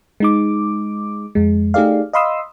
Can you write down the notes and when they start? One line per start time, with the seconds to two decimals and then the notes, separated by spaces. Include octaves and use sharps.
0.20 G#3 D#4 D6
1.35 F2 G#3
1.74 A3 D#4 G4 G#4 D5 F5
2.13 D#5 F5 B5 C6 D#6 E6